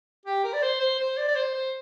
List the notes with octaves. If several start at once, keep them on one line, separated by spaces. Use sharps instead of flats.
G4
A#4
D5
C5
C5
C5
D5
D5
C5
C5